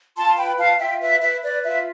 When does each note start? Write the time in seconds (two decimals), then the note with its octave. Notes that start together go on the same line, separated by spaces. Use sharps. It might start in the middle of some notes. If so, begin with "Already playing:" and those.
0.16 F4 A5 C6
0.28 C6
0.37 B4 G5 B5
0.58 F4 F5 A5
0.79 F4 E5 G5
1.00 B4 E5
1.21 B4 E5
1.42 B4 D5
1.63 F4 E5